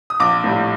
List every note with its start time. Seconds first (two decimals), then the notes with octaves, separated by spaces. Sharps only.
0.10 D#6
0.20 A#1 D6
0.44 A2 G3